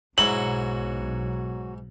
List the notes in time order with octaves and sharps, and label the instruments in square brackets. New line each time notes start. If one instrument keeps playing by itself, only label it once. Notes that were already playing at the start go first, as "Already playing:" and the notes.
[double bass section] B1 [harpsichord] G#2 E4 [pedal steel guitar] F#4 C#5 A#5 [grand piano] F#7